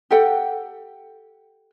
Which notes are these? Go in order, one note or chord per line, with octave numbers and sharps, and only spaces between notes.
G4 A4 F#5 G5